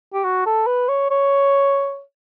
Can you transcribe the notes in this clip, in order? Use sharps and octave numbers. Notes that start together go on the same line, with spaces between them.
G4
F#4
A4
B4
C#5
C#5